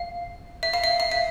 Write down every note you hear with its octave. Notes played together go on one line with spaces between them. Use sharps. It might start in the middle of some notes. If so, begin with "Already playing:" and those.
Already playing: F5
E5
F5
E5
F5
E5